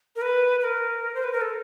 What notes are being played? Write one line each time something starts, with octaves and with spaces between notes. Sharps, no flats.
A#4
B4
B4
A#4
C5
B4
A#4
A4